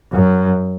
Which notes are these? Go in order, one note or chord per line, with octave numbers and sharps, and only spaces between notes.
F#2